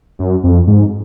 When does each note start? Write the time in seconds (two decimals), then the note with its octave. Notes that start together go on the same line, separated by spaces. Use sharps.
0.19 F#2
0.44 F2
0.67 G#2